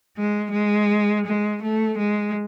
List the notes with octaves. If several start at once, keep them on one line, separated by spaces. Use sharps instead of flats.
G#3
G#3
G#3
A3
G#3